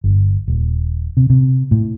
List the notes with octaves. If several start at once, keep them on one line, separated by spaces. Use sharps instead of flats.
G1
D#1
C3
C3
A2